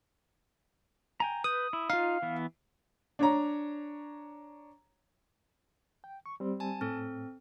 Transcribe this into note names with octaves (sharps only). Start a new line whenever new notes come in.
G5 G#5 A#5
B4 D#6 G6
E4
D#4 F4 F5
E3 B3
D4 C#5 A#5
G5
C#6
G3 C4
G#5 A5
A2 C4 A4